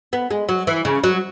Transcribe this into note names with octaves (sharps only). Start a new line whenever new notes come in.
B3
G#3
F#3
E3
C#3
F#3